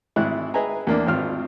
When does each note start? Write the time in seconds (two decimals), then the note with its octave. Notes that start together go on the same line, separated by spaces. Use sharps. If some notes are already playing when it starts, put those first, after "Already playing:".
0.16 G#1 G#2 E4 F#6
0.54 G#4 B4 D#5 E5 G#5 A#5
0.87 E2 A#3 D4
1.07 G#1 C4 F4 F6